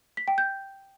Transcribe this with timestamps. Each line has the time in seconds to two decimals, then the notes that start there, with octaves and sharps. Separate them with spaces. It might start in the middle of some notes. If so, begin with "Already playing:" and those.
0.17 B6
0.28 G5
0.38 G6